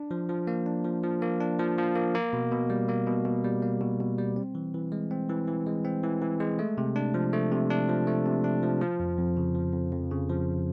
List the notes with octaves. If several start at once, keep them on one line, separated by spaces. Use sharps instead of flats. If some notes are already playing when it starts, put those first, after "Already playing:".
Already playing: D4
F3
F3
A#3
D4
F3
F3
A#3
D4
F3
F3
A#3
A#3
B2
B2
G3
A#3
B2
B2
G3
A#3
B2
B2
G3
C4
E3
E3
G#3
C4
E3
E3
G#3
C4
E3
E3
G#3
A3
C3
D4
F3
A3
C3
D4
F3
A3
C3
D4
F3
F3
F2
F2
C#3
F3
F2
F2
C#3
F3